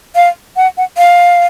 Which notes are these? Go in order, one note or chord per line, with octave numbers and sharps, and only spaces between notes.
F5
F#5
F#5
F5